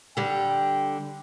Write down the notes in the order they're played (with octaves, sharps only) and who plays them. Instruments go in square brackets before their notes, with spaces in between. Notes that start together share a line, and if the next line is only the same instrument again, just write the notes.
[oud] D3 G3 [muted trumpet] G5